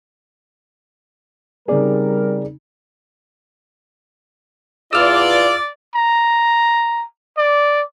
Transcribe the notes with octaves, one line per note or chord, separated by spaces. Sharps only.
C#3 G3 C4 D#4 G#4 A#4 D5
E2 F4 D5 E6 F6
A#5
D5